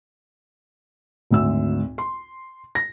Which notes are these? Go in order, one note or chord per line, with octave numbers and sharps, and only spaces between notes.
G#1 D2 E6
C6
A#6